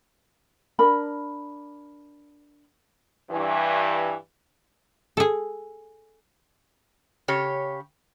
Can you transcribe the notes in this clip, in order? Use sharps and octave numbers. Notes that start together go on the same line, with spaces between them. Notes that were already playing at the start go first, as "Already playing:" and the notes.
D4 A#4 B5
G2 E3
G#4 A4
C#3 G4 C#5